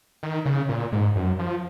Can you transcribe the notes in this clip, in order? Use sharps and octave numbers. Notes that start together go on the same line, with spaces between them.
D#3
C#3
A#2
G#2
F#2
F3